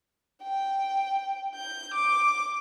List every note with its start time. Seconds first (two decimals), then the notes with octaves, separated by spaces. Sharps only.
0.43 G5
1.55 G6
1.94 D6